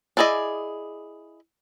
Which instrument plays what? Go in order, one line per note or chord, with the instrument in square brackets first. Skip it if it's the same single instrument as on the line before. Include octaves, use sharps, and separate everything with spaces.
[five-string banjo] D4 E4 G#4 D5 D#5